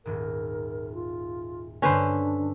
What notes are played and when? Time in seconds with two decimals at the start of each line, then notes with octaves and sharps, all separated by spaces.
0.05 D#1 G#2 A#4
0.94 F4
1.82 G2 D3 C#4 D4 B4 C5 B6